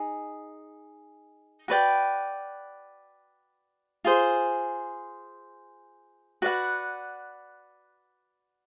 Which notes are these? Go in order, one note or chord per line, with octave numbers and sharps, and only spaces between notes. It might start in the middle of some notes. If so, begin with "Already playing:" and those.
Already playing: D#4 G#4
F#4 B4 D5 G5
F4 G#4 C5
F#4 B4 D5 F#5